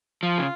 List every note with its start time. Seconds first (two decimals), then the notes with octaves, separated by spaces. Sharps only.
0.23 F3 F4
0.38 C#3